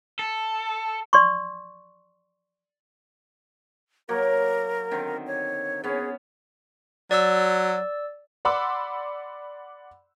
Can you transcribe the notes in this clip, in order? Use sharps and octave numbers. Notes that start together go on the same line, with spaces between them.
A4
D5 C6 C#6
F#3 A#3 F#4 A#4
D3 D#3 C4
C#5
B3 C#4 G#4
F#3 D5 E6
D5 F#5 B5 C6 D6 E6